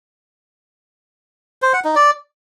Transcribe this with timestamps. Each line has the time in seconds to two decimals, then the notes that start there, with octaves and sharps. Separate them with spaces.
1.62 C5
1.73 F#5
1.84 D#4
1.95 D5